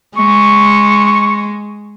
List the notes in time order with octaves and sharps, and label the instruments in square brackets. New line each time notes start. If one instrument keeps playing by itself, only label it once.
[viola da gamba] G#3 [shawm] C#6